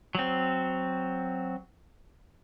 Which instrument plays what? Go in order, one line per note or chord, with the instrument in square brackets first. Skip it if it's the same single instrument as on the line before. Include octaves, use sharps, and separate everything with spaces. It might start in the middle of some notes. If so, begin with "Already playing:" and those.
[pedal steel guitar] F#3 C4